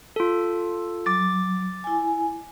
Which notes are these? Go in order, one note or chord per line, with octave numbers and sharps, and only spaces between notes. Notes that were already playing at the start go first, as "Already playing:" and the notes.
F4 A4
F#3 D6 A6
E4 G#5